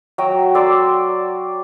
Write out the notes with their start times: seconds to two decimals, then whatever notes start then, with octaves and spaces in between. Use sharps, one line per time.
0.18 F#3 F#4 G5 A#5
0.55 D5 C6 D6 E6